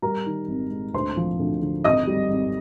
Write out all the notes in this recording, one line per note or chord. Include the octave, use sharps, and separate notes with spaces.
G3 A#4 A#5
D#3
G#1
G#2
D2 C5 C6
F3
D2
D3
G#1 D#5 D#6
G3
G#1